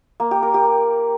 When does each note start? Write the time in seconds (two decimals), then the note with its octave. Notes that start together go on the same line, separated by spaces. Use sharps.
0.20 A#3
0.31 G4
0.43 A#4
0.54 G4